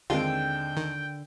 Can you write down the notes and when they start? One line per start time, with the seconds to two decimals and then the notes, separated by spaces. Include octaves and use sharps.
0.10 D#2 D3 G#3 C4 F4 G5
0.77 D#3